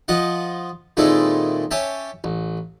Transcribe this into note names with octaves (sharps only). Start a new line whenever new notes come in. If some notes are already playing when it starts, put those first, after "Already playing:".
F3 F4 D#5 F#5
A#2 D#3 G#3 C4 E4 A4
C#4 G4 E5 A5
A1